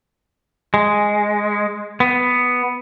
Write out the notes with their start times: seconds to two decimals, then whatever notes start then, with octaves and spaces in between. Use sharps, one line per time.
0.74 G#3
2.00 B3